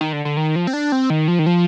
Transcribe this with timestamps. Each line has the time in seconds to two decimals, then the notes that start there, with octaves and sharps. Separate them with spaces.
0.01 D#3
0.13 D3
0.25 D3
0.37 D#3
0.56 F3
0.67 C4
0.73 D4
0.92 C4
1.10 D#3
1.28 F3
1.39 D#3
1.46 F3